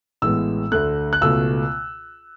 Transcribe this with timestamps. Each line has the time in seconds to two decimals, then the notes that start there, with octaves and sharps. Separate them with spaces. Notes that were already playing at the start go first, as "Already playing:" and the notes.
0.22 A1 A2 G#3 B3 E6
0.72 D2 D3 A3 F#6
1.13 F#6
1.21 C#2 B2 A3 E6